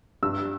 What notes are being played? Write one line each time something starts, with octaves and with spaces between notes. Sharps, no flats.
G2 E6